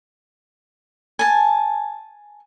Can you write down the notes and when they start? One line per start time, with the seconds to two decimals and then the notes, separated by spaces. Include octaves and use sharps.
1.19 G#5 A5